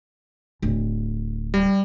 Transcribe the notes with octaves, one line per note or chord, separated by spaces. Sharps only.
D1
G3